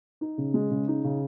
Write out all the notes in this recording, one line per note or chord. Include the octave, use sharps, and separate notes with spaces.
D#4
C#3
G#3
C#3
D#4
C#3